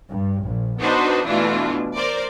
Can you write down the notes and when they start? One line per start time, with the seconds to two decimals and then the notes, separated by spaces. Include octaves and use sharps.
0.10 G2
0.44 A#1
0.81 B3 D4 D#4 F#4 B4 C5
1.26 B2 E3 A3 D4 E4 F4
1.96 A#4 C5 D5